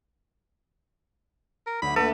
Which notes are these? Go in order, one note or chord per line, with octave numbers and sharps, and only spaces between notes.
A#4
D2 B5
A3 A#3 A4 B4